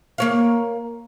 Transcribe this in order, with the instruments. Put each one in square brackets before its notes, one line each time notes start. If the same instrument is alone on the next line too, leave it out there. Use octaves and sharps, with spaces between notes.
[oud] A#3 C#5 F5